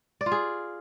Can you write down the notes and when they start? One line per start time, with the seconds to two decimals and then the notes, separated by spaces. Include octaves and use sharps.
0.21 D5
0.26 F4
0.32 G#4